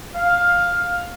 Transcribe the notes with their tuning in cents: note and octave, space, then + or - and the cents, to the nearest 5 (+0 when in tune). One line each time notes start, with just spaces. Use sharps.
F5 +10